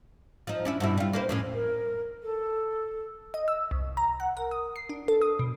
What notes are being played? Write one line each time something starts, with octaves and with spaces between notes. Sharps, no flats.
F3 D#4
C#4 D4 E4
G2 B2 E4
G3 F4
A#3 B4 C5
F2 A2 C#4
A#4
A4
D#5
E6
C2
A#5
F#5
A#4
D#6
C7
D4
A4
D#6
B2